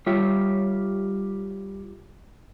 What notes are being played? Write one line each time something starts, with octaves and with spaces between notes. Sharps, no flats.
G3 F4 G4 C#5 E5